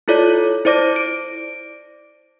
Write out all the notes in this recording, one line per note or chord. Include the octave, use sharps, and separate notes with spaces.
E4 F4 A4 C#5 D5
E4 C5 D5 D6 A#6
D7